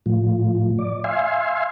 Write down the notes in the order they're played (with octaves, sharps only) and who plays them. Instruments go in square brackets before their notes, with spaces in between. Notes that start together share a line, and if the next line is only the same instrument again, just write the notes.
[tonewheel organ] A2 F3
D5
E5 F5 G#5 C6